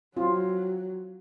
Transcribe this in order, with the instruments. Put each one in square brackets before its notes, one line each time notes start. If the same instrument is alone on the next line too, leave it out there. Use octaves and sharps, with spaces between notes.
[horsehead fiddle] F#3 [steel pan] C4 F4